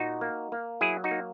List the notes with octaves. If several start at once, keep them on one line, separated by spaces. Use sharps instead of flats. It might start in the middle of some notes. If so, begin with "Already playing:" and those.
Already playing: A#2 D#4 F#4
A#3
A#3
F#3 E4 G#4
D#4 F#4
A#3